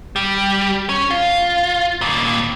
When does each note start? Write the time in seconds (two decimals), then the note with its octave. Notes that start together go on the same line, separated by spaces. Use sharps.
0.16 G3
0.89 C#4
1.11 F4
2.01 D#2 A#2